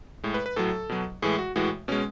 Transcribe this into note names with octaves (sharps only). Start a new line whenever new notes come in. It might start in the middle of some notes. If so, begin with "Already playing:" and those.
A2 G#3
B4
B4
A2 F#3 A4
B2 F#3
A2 E3 G#3 G#4
F#4
A2 E3 G#3 F#4
B2 G#3 C#4